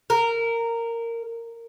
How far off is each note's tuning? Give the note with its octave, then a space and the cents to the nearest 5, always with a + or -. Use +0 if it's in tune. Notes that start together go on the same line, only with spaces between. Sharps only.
A#4 -15